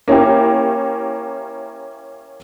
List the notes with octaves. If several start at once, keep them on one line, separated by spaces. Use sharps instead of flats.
A#3 C#4 E4 G4